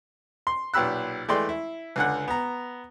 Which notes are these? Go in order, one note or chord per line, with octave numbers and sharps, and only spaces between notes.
C6
B1 A#2 G4 B5 E6 F#6
E3 G#3 A3 D5 G5 C6
E4
C#2 D3 F#5
B3 A#5